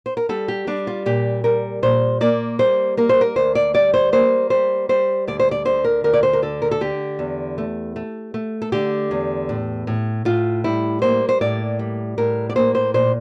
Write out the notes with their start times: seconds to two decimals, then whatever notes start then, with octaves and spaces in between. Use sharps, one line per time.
0.06 C5
0.17 A#4
0.29 G3 A4
0.48 G4
0.67 G3 D4
0.87 F4
1.06 A#2 G4
1.44 G3 A#4
1.83 A#2 C5
2.21 A#3 D5
2.59 G3 C5
2.97 A#3 A#4
3.09 C5
3.21 A#4
3.36 D2 C5
3.55 D5
3.74 G3 D5
3.94 C5
4.12 A#3 C5
4.50 G3 C5
4.89 G3 C5
5.27 D2 D5
5.39 C5
5.51 D5
5.65 D3 C5
5.84 A#4
6.04 D2 A#4
6.13 D5
6.23 C5
6.33 A#4
6.42 D3 A4
6.62 A#4
6.71 A4
6.81 D3 G4
7.19 E2
7.58 A3
7.96 A3
8.34 A3
8.62 A4
8.72 D3 G4
9.11 E2
9.49 A2
9.87 A2
10.25 A2 F4
10.64 G3 E4
11.02 A#3 C5
11.29 C5
11.41 A2 D5
11.79 G3
12.18 A2 A#4
12.50 D5
12.56 A#3 C5
12.75 C5
12.94 A#2 C5